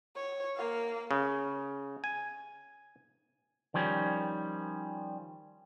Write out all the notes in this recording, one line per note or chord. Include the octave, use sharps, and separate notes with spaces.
C#5
A#3 F5
C#3
G#5
D#3 F3 G3 C#4